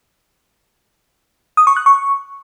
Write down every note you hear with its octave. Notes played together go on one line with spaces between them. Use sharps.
D#6
C#6
F#6
C#6